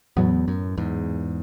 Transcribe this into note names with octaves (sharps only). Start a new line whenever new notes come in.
E2 A2 F#3 B3
F#2
E2 G#2